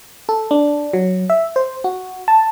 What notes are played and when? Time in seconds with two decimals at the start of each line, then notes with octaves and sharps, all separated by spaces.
0.29 A4
0.51 D4
0.93 F#3
1.30 E5
1.56 C5
1.84 F#4
2.28 A5